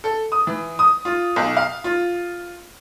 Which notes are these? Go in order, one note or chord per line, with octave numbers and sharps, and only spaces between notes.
A4
D#6
E3
D#6
F4
B1
F5
F4